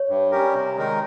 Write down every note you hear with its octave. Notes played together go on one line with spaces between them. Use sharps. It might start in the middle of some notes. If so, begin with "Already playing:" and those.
Already playing: C#5
G2
G3 C#4 G4 A#4
C3
D#3 G#3 D#4 A#4